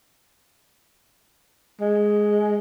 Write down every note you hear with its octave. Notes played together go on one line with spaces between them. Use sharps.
G#3